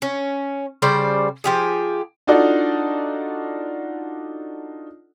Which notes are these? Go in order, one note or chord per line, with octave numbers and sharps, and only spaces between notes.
C#4
C#3 G3 C5 D5
F3 G4 G#4
D4 D#4 F4 F#4 A4 D5